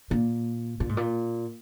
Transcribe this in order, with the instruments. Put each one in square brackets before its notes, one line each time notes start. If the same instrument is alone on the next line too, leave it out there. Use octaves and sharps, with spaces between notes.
[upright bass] A#2
A#2
G#2
A#2